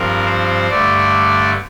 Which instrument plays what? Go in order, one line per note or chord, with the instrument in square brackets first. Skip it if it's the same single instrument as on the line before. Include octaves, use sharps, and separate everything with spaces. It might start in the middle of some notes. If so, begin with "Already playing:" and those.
Already playing: [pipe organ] G2 F3 C4 A#4
C5
G2 D3 A3 D5